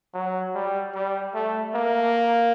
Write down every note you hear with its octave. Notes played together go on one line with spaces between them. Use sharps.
F#3
G3
G3
A3
A#3